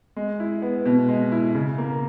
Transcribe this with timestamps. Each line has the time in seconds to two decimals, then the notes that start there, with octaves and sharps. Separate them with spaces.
0.16 G#3
0.40 E4
0.62 B3
0.86 B2
1.08 G#3
1.32 E4
1.55 C#3
1.78 A#3